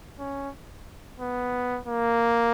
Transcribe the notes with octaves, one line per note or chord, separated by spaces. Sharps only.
C#4
B3
A#3